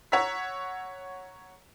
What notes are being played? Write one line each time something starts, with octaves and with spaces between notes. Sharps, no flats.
C#5 F#5 A#5 E6 B6